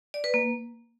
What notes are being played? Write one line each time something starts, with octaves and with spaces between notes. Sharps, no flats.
D5
B4
A#3